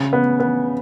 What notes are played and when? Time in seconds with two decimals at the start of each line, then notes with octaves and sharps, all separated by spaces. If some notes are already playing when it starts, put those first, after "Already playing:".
Already playing: C#3
0.13 B3
0.40 B3